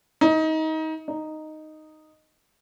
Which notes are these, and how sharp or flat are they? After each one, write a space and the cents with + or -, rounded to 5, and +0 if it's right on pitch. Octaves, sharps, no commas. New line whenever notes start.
D#4 +25
D#4 -5